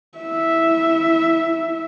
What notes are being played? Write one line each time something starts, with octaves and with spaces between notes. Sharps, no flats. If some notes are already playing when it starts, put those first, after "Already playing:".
E4 E5